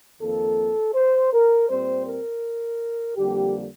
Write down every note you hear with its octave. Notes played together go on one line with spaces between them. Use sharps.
F2 D#3 A#3 A4
C5
A#4
A#2 G3 C4 C5
A#4
F2 D3 G3 A#3 G4